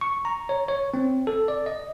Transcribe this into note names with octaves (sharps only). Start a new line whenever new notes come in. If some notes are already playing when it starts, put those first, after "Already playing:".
C#6
A#5
C#5
C#5
C4
A4
D5
D#5